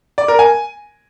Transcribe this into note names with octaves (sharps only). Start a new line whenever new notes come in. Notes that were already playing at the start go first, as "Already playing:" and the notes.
D5
A#4
G#5